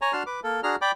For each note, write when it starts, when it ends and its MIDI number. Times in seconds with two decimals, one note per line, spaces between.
0.02 0.13 73
0.02 0.13 80
0.02 0.13 82
0.13 0.23 62
0.13 0.23 66
0.13 0.23 81
0.13 0.23 84
0.13 0.23 89
0.26 0.40 71
0.26 0.40 86
0.43 0.61 58
0.43 0.61 69
0.63 0.76 62
0.63 0.76 66
0.63 0.76 68
0.63 0.76 82
0.63 0.76 89
0.82 0.91 74
0.82 0.91 79
0.82 0.91 83
0.82 0.91 86